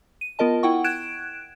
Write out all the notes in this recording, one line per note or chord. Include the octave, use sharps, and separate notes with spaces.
D#7
B3 F4 A#4 D#5 A5
E4 F#5 G5 C#6
F#6 G#6 D7 E7